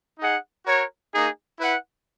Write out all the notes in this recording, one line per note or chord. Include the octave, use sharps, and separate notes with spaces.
D#4 G#4 D#5 F#5
F#4 A#4 C#5
A#3 D#4 G#4
E4 B4 F#5